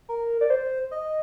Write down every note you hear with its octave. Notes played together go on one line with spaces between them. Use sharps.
A#4
D5
C5
D#5